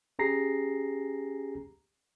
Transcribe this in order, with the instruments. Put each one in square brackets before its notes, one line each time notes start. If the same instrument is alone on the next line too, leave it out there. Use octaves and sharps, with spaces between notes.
[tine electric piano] C#4 G4 G#4 A#5 A#6 C7